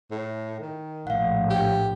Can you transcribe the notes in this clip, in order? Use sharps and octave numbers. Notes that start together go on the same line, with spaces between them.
A2
D#3
A#1 A2 F5 F#5
G4